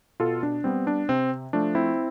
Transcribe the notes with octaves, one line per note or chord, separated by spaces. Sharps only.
B2 F4 A4
D4
G3 B3 C4
D4
C3 C4
F3 A3 D4
C4 E4